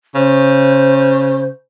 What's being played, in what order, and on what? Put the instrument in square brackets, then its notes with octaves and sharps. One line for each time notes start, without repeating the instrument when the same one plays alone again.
[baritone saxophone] C#3 [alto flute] C5